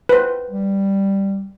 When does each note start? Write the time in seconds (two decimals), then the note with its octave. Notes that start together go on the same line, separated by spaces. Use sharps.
0.09 B4 C5
0.50 G3